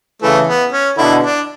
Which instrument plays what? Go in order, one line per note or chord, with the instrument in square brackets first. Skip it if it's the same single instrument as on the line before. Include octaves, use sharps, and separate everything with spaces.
[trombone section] C#3 E3 [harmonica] A3
[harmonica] B3
C#4
[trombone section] B2 D3 [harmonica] E4
[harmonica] D4